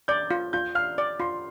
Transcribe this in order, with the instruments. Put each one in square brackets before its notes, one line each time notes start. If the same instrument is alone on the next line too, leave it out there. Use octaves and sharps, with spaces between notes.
[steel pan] D5 [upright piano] G6
[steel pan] F4
[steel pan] F4 [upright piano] G6
[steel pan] F5 [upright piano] F6
[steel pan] D5
[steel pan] F4 [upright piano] C6